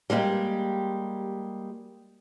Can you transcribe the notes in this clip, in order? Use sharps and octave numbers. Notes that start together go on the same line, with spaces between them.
G3 G#3 A#3 G4